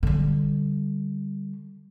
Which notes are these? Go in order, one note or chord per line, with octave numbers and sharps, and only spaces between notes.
D3 G3